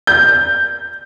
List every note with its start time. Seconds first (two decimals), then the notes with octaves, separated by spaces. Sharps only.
0.07 G6